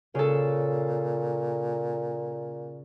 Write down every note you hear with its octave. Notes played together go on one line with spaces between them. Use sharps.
A#2 C#3 A4